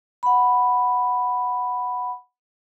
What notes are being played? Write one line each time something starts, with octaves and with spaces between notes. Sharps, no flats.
F#5 B5